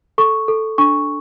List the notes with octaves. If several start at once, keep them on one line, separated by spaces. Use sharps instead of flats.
A4 C#6
A4
D4 C#6